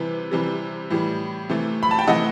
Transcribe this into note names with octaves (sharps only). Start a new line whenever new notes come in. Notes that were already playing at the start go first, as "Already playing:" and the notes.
Already playing: C3 E3 G3 B4
C3 E3 G3
A2 E3 G3
C3 E3 A3
B5
A5
G5
C3 E3 A3 D#5 F#5